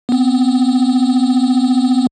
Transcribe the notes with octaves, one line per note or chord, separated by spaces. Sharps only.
B3 C4